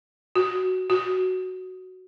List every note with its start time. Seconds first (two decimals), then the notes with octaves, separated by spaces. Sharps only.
0.36 F#4
0.90 F#4